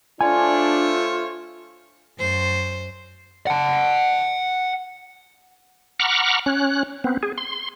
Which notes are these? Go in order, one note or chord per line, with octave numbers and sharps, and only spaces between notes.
A3 D4 F4 C5 C#5 G#5
F#2 C5
F#5 A5
F#5 A#5 B5 C#6 D6 F6
C#4 F#6
B3 C4
G#4
C6